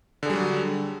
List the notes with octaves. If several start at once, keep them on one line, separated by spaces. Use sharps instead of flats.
D3 F#3 G3 G#4